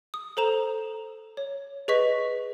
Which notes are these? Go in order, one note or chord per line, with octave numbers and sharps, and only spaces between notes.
D#6
A4 C5 A#5 E7
C#5
G#4 B4 D#5 C#6 B6